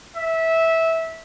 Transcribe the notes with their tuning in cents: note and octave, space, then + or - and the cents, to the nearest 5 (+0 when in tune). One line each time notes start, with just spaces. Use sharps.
E5 -15